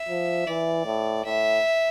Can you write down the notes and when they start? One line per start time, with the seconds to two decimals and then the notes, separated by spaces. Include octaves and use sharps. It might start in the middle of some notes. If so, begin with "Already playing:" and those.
Already playing: E5
0.09 F3
0.47 E3 D5
0.86 A2
1.25 A2 E5